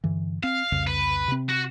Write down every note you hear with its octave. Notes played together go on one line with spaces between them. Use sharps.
G2 D3 E3
C4 F5
C2 F2 C#3
B4
C3 C4
F#4